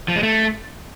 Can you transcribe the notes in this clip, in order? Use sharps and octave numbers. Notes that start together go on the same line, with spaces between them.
F3
G#3
A3